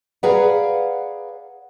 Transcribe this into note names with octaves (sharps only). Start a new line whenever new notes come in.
G#4 B4 D5 F5 F#5 A#5